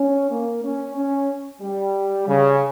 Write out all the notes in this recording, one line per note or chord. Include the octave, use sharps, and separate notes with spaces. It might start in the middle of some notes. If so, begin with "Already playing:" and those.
Already playing: C#4
A#3
C#4
C#4
G3
C#3